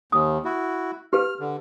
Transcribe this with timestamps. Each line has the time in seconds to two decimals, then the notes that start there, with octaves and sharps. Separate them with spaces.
0.12 D#2 D#6
0.45 E4 F#4
1.13 G4 B4 F6
1.40 D3